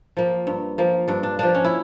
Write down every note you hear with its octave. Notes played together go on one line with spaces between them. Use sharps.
F3 A#3
G2
F3 A#3
G2 D4
D4
F3 A#3 D4
C#4
E4